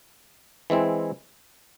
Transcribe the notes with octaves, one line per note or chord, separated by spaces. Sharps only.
E3 G#3 C4 E4